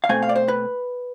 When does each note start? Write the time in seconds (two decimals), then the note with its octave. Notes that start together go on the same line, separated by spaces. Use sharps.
0.04 F5
0.09 B2 A3 C4 G#5
0.22 F5
0.29 D5
0.36 C5
0.48 B4